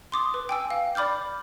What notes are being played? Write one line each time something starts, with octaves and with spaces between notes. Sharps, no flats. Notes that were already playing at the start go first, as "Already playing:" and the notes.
C6 D6 D#6
B4
G5 G#5 E6
F5
D5 B5 D6 F6 G6